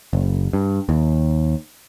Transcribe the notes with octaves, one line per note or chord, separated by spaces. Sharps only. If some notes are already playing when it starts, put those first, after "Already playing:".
F#1
G2
D#2